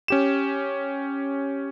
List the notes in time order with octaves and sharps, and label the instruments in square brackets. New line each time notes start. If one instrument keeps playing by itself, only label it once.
[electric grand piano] C#4 G4 E7